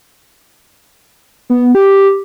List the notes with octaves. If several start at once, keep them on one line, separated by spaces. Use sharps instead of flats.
B3
G4